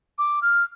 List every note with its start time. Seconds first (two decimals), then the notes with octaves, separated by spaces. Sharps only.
0.18 D6
0.42 F6